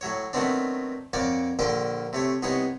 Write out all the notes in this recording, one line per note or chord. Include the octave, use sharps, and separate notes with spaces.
A2 F#3 C#5
D#3 F#3 A3 B3 C4 D4
F2 A#3 C#5 D5 F#5
A#1 A#2 D3 A#3 C5 G5
C3 A3 C#5
C2 B3 D#4 G#4 C#5